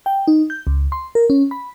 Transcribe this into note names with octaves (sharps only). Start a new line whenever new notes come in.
G5
D#4
G6
C#2
C6
A#4
C#4
B5